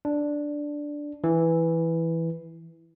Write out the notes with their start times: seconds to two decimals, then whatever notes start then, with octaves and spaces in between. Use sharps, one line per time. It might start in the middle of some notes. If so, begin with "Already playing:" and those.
0.05 D4
1.24 E3